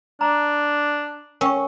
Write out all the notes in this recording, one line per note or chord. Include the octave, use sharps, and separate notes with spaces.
D4 A#5
C#4 A#4 G5 C#6